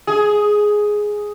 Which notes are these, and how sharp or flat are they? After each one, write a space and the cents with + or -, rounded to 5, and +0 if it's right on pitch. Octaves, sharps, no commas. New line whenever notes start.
G#4 +5